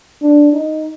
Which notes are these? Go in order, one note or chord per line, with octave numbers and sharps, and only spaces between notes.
D4
D#4